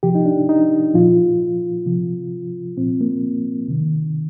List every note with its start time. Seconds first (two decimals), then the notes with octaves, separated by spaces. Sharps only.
0.03 C3 F3 G4
0.15 D#4
0.25 D4
0.49 D#4
0.94 A#2 F3 F4
1.86 C3 F3
2.77 A#2 F3 C4
3.01 A#3
3.68 C3 D#3